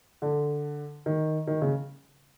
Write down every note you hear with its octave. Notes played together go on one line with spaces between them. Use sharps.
D3
D#3
D#3
C#3